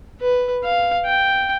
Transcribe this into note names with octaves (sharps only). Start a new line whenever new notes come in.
B4
F5
G5